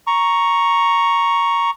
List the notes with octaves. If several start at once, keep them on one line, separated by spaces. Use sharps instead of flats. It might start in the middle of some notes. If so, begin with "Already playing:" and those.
A#5 C#6